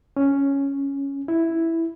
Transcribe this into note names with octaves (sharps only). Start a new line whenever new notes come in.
C#4
E4